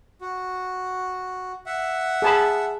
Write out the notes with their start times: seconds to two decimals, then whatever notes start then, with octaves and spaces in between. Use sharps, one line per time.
0.21 F#4
1.66 E5 F#5
2.22 G#4 A5 B5